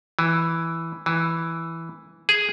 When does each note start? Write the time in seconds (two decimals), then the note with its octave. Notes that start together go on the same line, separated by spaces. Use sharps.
0.19 E3
1.06 E3
2.29 G#4